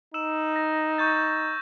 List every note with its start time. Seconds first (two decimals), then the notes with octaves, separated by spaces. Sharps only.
0.14 D#4 E6 E7
0.56 A#6
0.98 C#6 G6 A6